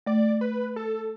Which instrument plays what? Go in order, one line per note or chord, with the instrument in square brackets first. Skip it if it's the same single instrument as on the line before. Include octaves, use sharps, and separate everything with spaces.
[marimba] A3 [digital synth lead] D5
[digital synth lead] B4
A4